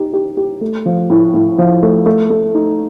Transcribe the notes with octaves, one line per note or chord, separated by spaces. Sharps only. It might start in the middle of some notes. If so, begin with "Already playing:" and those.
Already playing: D#4 G4
G4
G4
A3
F3
A2
A2
F3
A3
A3
A3
D#4